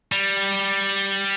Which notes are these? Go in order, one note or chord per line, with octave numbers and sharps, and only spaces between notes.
G3